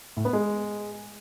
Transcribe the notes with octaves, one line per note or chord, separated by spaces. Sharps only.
A2
B3
G#3